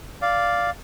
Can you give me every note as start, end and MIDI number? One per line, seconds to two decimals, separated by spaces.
0.22 0.70 74
0.22 0.70 77